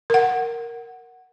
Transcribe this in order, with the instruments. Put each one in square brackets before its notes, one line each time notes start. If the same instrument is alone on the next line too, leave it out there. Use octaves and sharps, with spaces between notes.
[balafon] A#4 F#5